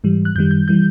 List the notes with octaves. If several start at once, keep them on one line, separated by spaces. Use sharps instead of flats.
G#2 E3 G3
F#6
F#2 D#3 G3 G6
G6
E3 G3 G6